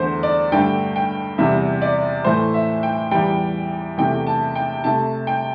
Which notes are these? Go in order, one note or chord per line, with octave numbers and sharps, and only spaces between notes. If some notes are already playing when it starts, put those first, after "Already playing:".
Already playing: E2 D3 A3 C5
D5
G2 D3 A3 G5
G5
E2 C3 G3 E5
D5
A2 E3 A3 C5
E5
G5
E2 E3 G3 G5
E2 C3 A3 G5
A5
G5
C3 A3 A5
G5